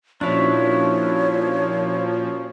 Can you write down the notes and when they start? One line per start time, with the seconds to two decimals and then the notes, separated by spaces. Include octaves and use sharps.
0.21 A#2 F3 C#4 D4 E4 F#4 C#5 C#6